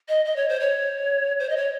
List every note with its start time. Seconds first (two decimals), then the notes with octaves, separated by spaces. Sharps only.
0.09 D#5
0.25 D#5
0.36 C#5
0.49 C5
0.60 C#5
1.40 C5
1.49 D#5
1.57 C#5